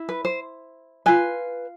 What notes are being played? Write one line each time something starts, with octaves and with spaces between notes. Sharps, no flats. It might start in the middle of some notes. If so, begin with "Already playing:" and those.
Already playing: E4
B4
C5
F4 B4 G#5